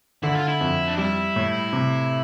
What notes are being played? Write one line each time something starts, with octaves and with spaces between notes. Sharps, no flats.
D3 E4
F4
E4
F2
D4
G3 E4
A2
C3